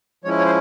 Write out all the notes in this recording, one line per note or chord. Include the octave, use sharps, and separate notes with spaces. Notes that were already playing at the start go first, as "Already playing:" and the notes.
F3 G#3 C#4 E4 C#5
C#5
C5